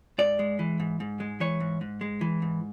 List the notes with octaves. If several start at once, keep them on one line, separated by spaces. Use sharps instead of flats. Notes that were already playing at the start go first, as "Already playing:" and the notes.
G#2 D5
G#3
E3
G#2
G#2
G#3
E3 C#5
G#2
G#2
G#3
E3
G#2